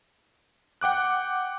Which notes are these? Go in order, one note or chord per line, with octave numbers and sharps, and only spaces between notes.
F#5 G5 D6 F#6